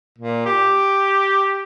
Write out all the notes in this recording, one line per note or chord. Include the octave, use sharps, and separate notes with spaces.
A#2
G4